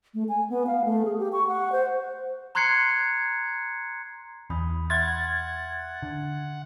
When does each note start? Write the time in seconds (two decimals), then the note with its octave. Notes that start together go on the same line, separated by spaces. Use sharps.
0.14 A3
0.29 G#5
0.50 B3
0.67 F5
0.85 A3
1.05 G#4
1.18 G4
1.33 C#6
1.48 F#5
1.72 C5
2.55 A#5 C6 F#6 G#6 C7 C#7
4.50 E2 B5 D#6 G6
4.90 E5 F#5 C6 F6 G#6 A6
6.03 D3